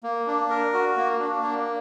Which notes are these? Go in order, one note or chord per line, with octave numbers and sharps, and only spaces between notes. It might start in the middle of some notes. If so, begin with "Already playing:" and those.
A#3
D4
A#4
F#4
A#3
D4
A#3